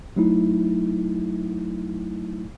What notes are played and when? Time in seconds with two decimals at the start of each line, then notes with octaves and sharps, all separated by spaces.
0.16 F#3 A3 D#4 E4